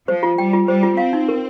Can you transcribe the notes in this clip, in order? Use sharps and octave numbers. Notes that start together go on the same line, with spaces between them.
F3 C5
F4
G3 G5
F4
G3 C5
F4
C4 F5
D#4
A#4